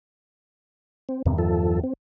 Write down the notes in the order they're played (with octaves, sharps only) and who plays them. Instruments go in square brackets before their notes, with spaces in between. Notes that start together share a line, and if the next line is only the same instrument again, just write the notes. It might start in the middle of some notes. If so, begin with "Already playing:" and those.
[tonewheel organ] C4
[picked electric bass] E2 G2 D#3 [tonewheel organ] C3
[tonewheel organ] F3 A4
C4